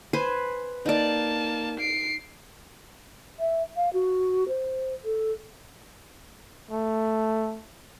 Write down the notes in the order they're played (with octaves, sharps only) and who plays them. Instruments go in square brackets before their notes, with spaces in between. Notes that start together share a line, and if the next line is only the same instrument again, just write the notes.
[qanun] B4 C5 G#5
[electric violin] A#3 A5 [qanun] D#4 D5
[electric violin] C7 D7
[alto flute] E5
F5
F#4
C5
A4
[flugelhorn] A3